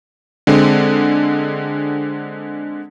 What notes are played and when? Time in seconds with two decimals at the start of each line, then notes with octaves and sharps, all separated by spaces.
0.47 D3 G#3 C4